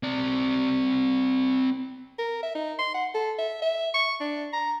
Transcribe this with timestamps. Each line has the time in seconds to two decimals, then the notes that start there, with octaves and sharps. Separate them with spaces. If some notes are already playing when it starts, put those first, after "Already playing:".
0.03 C4 D5
2.18 A#4
2.43 E5
2.55 D#4
2.79 C6
2.94 F#5
3.14 A4
3.39 E5
3.62 E5
3.94 C#6
4.21 D4
4.53 A#5